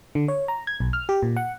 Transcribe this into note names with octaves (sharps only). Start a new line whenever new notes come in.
D3
C#5
A#5
G#6
B1
F6
G4
A#2
F#5